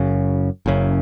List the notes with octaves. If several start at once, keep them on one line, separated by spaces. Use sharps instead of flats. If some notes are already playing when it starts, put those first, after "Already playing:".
Already playing: F#1 F#2 C#3
F#1 F#2 C#3